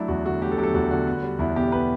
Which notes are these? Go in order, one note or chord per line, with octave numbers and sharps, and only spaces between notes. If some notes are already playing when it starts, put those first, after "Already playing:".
Already playing: F#3 A3 D4 E4
E2 F#4
D3 F#4
A3 G4
A4
F#3 G4
A4
E2 F#4
D3 F#4
B3
G3
E2 E4
B2 G4
B3 B4